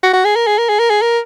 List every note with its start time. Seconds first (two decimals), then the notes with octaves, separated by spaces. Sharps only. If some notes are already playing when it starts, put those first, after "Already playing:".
0.03 F#4
0.13 F#4
0.25 G#4
0.36 A#4
0.47 G#4
0.58 A#4
0.69 G#4
0.79 A#4
0.90 G#4
1.02 A#4